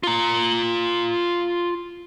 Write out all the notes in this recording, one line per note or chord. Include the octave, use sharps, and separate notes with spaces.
F4 A#5